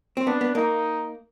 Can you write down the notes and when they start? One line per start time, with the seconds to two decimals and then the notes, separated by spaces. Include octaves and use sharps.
0.17 C4
0.27 B3 D4
0.41 B3
0.55 A#3 D#4